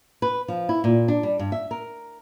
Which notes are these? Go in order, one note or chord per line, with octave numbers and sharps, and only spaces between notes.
B4
F3
E4
A#2
D4
G3
G2
E5
A#4